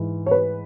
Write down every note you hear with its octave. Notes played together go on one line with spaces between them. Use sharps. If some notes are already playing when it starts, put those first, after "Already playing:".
Already playing: G#2 E3
C#5
B4